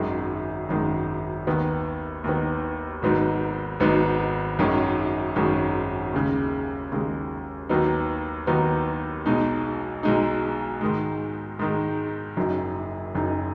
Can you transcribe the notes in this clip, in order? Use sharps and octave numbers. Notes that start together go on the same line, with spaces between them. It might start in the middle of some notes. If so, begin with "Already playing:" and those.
Already playing: G#1 F#2 D#3 G#3
G#1 F#2 D#3 G#3
D#2 D#3 B3
D#2 D#3 B3
G#1 G#2 F#3 B3 D#4
G#1 G#2 F#3 B3 D#4
G#1 F#2 D#3 G#3 C#4
G#1 F#2 D#3 G#3 C#4
D#2 C#3 G#3
D#2 C#3 G#3
D#2 D#3 F#3 B3 D#4
D#2 D#3 F#3 B3 D#4
B1 B2 G#3 D#4
B1 B2 G#3 D#4
G#2 D#3 G#3
G#2 D#3 G#3
F#1 F#2 F#3 D#4
F#1 F#2 F#3 D#4